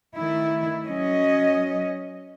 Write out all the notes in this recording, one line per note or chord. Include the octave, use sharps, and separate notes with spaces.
D#3 A3 E4
F#3 C#4 D#5